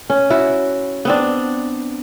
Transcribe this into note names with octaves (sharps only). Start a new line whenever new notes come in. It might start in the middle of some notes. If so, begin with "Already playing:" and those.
C#4
E4 F#4
B3 C4 D4